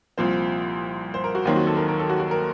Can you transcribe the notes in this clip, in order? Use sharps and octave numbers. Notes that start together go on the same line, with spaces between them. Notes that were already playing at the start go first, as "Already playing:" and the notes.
C2 A#2 F3 C4 C5
C5
A#4
F#4
D#2 D#3 F#3 C4 F4
F#4
A4
A#4
A#4
A4
F#4
F#4
A#4